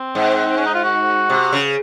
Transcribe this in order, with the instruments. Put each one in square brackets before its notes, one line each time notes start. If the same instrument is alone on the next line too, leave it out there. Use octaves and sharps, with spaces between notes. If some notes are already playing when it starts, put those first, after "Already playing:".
Already playing: [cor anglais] C4
[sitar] G#2
[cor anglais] C#4
D#4
F4
F#4
[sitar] C3
C#3